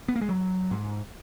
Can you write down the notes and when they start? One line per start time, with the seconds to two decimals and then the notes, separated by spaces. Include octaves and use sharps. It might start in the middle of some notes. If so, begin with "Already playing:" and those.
0.08 B3
0.16 A#3
0.21 G#3
0.29 F#3
0.71 G#2